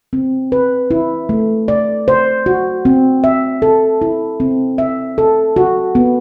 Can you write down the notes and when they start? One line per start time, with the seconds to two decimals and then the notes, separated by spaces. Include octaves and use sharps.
0.13 C4
0.52 B4
0.91 E4
1.29 A3
1.68 D5
2.08 C5
2.46 F#4
2.85 C4
3.24 E5
3.62 A4
4.02 E4
4.40 C4
4.78 E5
5.18 A4
5.56 F#4
5.95 B3